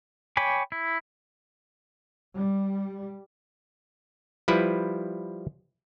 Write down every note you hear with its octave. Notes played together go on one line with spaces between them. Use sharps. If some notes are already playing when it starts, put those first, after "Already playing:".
C#5 G5 G#5 B5 D6
E4
G3
F3 G3 E4 B4